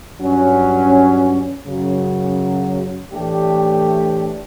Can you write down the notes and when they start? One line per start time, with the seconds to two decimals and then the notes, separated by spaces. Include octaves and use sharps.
0.20 G2 F#3 C#4
1.66 F#2 C#3 F#3
3.12 A2 E3 A3 D4 G4